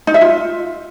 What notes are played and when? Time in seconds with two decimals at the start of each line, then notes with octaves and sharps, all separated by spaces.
0.07 D#4
0.14 E5
0.21 F4